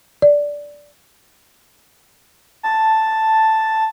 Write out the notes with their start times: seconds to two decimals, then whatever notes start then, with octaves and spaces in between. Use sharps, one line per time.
0.22 D5
2.63 A5